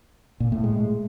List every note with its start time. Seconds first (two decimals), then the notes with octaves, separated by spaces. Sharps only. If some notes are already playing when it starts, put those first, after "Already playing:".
0.40 A#2
0.52 A2
0.64 G#3